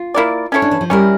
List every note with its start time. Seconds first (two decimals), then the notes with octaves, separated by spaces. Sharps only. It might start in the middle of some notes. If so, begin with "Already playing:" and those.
Already playing: F4
0.14 A#3 E4 A#4 D5
0.52 C#4 E4 A4 C#5
0.62 D4
0.71 E3
0.81 F3
0.90 G3 C#4 E4 A#4